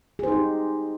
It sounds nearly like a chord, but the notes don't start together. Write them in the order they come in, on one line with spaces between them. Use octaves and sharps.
G#4 C5 D#4 G4